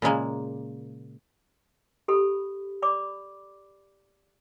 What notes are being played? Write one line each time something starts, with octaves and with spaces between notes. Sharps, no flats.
A#2 C#3 G#3 A#3
G4 A4 B5
D5 B5 D6